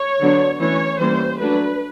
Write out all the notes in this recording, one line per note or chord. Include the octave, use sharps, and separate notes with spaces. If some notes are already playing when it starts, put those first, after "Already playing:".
Already playing: C#5
D3 F#3 B3 D4
E3 A3 C#4 C#5
E3 G3 A#3 C#4 C5
F#3 A3 D4 B4